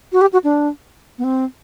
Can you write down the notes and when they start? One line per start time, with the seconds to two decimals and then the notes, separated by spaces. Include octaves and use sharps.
0.13 F#4
0.21 G4
0.33 F#4
0.44 D4
1.18 B3
1.24 C4